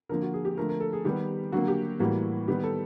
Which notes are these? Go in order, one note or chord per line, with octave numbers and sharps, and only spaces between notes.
D3 F3 A#3 A#4
F#4
G#4
G4
D3 F3 A3 A#4
A#4
A4
G#4
D#3 G3 B3 G4
D3 F#3 A#3 F#4
G4
A2 E3 G3 A#3 F#4
D#3 G3 B3 G4
A4